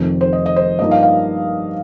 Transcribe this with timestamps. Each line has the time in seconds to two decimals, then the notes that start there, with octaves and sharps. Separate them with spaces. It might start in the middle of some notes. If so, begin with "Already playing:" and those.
Already playing: F1 F2 D#3
0.21 C5
0.33 D#5
0.46 D#5
0.56 C5
0.79 G2 F3 A#3 D#4 D#5
0.91 F5
1.03 F5